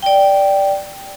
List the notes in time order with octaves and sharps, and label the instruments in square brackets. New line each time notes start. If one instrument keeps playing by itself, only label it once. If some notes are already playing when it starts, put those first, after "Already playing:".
[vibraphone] D5 G5